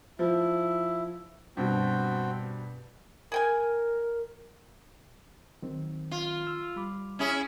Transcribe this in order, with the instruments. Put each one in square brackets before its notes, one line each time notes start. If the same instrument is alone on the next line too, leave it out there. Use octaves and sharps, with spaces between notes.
[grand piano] F3 [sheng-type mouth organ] E4
[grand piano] G2 B2 [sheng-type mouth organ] C4 F#4 G5
[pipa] G#4 G5 G#5 [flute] A#4
[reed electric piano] D#3 F#3 C4
[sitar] F4
[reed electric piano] E6 F6
G3 B5 D6
[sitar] C#4 E4 G#4